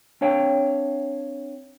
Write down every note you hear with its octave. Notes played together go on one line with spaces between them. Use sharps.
C4 D4 C#5 F5 G5